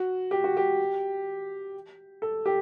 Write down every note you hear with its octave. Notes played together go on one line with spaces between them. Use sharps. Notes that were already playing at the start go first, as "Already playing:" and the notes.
Already playing: F#4
G4
F#4
G4
A4
G4